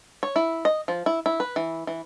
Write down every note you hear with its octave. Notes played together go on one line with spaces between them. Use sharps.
C#5
E4
D#5
F3
E4
E4
B4
E3
E3